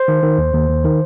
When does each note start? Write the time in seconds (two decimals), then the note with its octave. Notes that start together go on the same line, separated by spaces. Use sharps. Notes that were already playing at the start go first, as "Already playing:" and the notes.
Already playing: C5
0.08 D#3
0.23 D#3
0.38 D#2
0.53 D#2
0.69 D#2
0.85 D#3